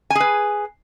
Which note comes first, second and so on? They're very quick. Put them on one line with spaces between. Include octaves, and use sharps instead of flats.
G#5 G#4 B4